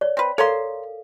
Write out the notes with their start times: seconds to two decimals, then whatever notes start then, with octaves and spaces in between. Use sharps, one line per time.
0.01 C#5 D5
0.17 C4 B4
0.38 A4 A#4 C#5 F5 A#5 C6